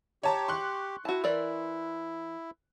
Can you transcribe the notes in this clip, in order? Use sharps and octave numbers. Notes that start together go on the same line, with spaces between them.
G4 C#5 A5 A#5
C6 C#6 F#6
E4 F#4 A5
E3 A#4 D5